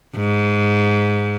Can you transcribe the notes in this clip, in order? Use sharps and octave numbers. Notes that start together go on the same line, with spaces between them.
G#2